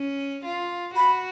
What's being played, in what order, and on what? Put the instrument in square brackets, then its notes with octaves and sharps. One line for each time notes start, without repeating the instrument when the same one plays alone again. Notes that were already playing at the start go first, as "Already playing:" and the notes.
Already playing: [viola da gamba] C#4
F4
[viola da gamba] F#4 [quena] B5